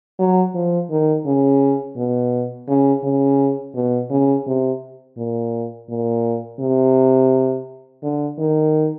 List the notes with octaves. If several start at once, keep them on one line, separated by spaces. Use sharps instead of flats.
F#3
F3
D#3
C#3
B2
C#3
C#3
B2
C#3
C3
A#2
A#2
C3
D3
D#3